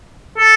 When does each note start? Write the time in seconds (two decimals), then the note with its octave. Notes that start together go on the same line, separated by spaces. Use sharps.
0.38 A4